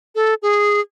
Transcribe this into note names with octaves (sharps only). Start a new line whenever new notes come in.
A4
G#4